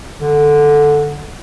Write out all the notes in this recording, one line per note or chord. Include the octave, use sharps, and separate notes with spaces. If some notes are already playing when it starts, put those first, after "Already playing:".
D3